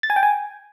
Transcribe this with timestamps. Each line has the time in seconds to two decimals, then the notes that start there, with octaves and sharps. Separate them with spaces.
0.03 A6
0.10 G#5
0.16 G5
0.23 G#5